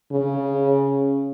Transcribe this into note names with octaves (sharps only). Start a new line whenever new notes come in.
C#3